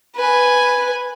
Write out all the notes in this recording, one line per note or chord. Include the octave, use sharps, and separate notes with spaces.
B4 G#5